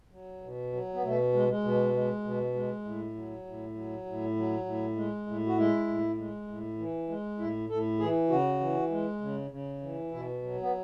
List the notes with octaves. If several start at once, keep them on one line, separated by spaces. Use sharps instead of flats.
F#3
B2
F#3
B3
B2 A3
G#3
G#3
B2
G#3
B2
G#3
A2
F#3
A2
F#3
A2
F#3
A2
G#3
A2
F#4
G#3 E4
A2
G#3
A2
E3
G#3
A2 E4
A2 A4
E3 G#4
C#3 F#4
E3
G#3
C#3
C#3
E3
B2 E4
F#3
B3